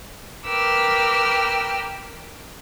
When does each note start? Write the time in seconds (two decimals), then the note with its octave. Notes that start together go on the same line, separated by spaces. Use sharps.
0.46 A#4 B4 G5 D6 E6 F6